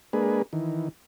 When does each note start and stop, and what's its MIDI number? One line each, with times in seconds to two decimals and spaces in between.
0.13 0.42 56
0.13 0.42 58
0.13 0.42 62
0.13 0.42 68
0.13 0.42 71
0.53 0.89 51
0.53 0.89 52